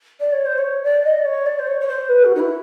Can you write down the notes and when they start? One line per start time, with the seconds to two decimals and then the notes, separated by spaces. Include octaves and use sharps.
0.20 D5
0.32 C#5
0.45 C5
0.58 C#5
0.83 D5
1.04 D#5
1.18 D5
1.25 C#5
1.46 D5
1.59 C5
1.67 C#5
1.80 C#5
1.88 C5
2.09 B4
2.24 F#4
2.35 D#4
2.39 E4